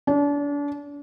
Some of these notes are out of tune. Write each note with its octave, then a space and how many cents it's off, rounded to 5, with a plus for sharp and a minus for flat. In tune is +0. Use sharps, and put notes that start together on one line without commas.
D4 -35